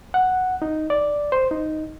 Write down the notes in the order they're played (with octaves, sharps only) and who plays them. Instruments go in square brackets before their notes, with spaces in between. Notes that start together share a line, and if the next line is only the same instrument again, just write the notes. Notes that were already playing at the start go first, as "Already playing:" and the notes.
[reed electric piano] F#5
D#4
D5
C5
D#4